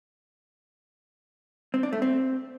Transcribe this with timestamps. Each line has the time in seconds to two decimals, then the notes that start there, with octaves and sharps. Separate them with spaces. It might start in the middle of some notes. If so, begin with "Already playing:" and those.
1.74 C4
1.83 D4
1.93 A3
2.02 C4